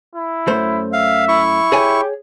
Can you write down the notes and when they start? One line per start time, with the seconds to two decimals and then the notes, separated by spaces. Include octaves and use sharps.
0.15 E4
0.47 F#2 A3 C5
0.93 E5 F5
1.28 E4 C#6
1.72 G4 G#4 C#5 G#5